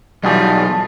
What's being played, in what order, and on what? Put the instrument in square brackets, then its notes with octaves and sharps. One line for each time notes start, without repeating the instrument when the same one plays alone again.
[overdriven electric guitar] B1 [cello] E3 F4 [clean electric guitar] G3 F#4 G#4 [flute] A5